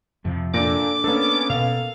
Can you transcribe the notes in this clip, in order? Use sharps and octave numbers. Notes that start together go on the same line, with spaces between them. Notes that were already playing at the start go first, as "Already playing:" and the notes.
F2 C3 F3
A#2 D4 A4 D6 A#6 D7
A#3 B3 C#4 D4 A4
B2 F5